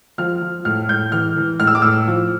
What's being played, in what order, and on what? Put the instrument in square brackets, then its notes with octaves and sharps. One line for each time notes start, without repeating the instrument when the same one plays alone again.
[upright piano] F3 F6
F3
A2 F6
A2 G6
E3 F6
E3
A2 F6
E6
D6
A2 E6
F3